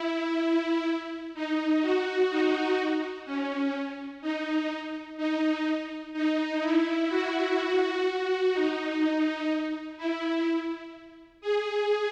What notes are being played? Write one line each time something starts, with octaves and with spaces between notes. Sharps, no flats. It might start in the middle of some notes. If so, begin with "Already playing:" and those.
Already playing: E4
E4
D#4
F#4
D#4
C#4
D#4
D#4
D#4
E4
F#4
F#4
F#4
D#4
E4
G#4